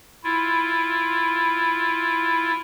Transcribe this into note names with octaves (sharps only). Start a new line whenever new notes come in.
E4 F4